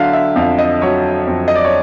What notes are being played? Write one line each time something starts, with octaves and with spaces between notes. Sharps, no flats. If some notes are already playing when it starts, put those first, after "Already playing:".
Already playing: D3 F#3 E5 F5
E5
F2 F5
D#5
F#3 C#5
F2
D#5
D5
C#5